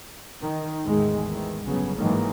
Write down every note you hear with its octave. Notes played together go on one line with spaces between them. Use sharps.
D#3
A1 E2 D#3 G#3
D#3 E3
G1 C#3 F#3 B3 C#4
G#2 D#3 E3 F#3 G#3 A#3